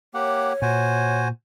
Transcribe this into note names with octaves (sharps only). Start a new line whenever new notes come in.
A#3 G4 C#5 F#5
A#2 F#4 C5 G#5